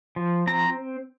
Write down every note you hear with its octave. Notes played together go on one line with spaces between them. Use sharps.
F3
C4 A#5